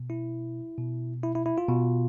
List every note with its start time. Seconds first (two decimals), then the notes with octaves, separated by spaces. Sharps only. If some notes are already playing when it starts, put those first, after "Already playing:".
Already playing: B2
0.10 E4
0.78 B2
1.23 E4
1.35 E4
1.46 E4
1.58 F4
1.68 B2